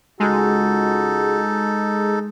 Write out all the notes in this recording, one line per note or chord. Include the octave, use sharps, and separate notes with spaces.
C#2 G#3 D#4 F#4 A4